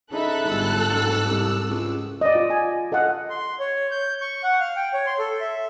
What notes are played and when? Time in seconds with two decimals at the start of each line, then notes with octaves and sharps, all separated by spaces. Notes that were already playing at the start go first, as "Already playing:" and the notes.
0.12 C#3 D#4 A4 E5 B5 F#6
0.49 G1 G#2 E6
0.90 F#1
1.26 C2
1.70 C#2
2.21 D5 D#5
2.35 F4
2.50 G#5
2.92 A4 D#5 F5 F#5
3.30 C6
3.59 C#5
3.91 G6
4.21 C#6
4.44 F#5
4.60 F5
4.76 G5
4.93 C#5
5.07 C6
5.19 A4
5.40 E5